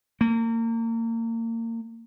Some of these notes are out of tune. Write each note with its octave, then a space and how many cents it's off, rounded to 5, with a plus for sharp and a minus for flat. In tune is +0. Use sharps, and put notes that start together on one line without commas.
A#3 -30